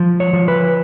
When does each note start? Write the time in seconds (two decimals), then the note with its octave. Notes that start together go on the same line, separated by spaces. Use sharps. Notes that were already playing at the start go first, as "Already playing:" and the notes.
Already playing: F3
0.20 C#5
0.33 F3
0.48 B4